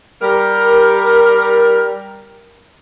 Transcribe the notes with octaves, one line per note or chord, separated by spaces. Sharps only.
G3 A#4